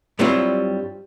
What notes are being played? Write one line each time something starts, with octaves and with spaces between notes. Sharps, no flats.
G2 F#3 G3 C4 E4 F4